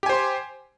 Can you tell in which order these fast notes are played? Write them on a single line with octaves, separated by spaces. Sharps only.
G4 G#5 C5 C6